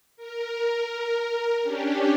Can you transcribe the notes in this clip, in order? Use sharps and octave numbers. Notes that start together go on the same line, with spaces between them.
A#4
C#4 D4 G4